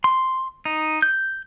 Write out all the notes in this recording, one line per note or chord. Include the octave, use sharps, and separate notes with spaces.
C6
D#4
G6